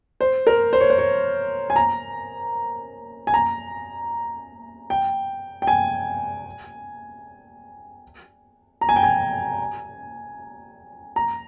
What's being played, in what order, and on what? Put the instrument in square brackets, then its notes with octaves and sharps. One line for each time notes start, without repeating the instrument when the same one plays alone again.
[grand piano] C5
A#4
C5
C#5
C5
C#5
G#5
A#5
G#5
A#5
G5
G5
G#5
A#5
G#5
G5
G#5
A#5